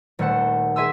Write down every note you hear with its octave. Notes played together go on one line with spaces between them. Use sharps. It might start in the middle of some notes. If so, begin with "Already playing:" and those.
D#1 A3 C5 F#5 E7
G#4 E5 G#5 C6 D#6 E6